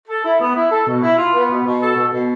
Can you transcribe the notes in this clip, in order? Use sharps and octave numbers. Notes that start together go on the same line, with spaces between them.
A4
E4
B3
E4
A4
B2
E4
F4
B3
B2
B2
A4
B2
B2